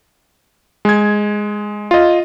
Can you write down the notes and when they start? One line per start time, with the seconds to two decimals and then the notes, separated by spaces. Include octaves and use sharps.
0.85 G#3 G#6
1.91 F4 D#5